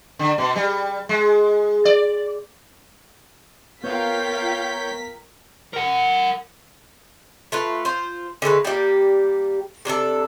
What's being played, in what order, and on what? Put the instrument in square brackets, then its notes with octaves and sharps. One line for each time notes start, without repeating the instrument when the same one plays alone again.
[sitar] D3
B2
G3
G#3
D5
[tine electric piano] B3 [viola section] F4 F5 G5 [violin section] A#4 B6 [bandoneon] C#5 G6
[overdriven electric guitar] A#4 F#5
[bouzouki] A3 F4 B4
F4 C5
D3 G#3 A3 B4
G3 A#3 D#4 G4
C3 D4 G#4 A4